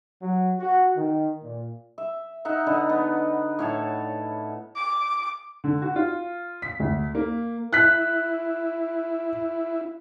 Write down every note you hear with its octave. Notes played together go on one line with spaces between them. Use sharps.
F#3
F#4
D#3
A#2
E5
D#4 E5 F#5
D3 D#4 B4
B3
A2 C#5 A5
D6
D3
F#4
F4
B6
D2
A#3
E4 F#6 B6